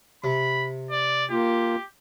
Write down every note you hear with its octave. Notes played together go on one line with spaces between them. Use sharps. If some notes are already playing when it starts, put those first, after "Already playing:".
C3 B5
D5
A#3 F4 G4